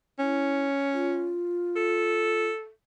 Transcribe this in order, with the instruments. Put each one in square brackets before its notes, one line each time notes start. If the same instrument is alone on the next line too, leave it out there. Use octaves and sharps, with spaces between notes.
[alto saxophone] C#4 [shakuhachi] E4
[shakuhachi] F4
[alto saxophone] A4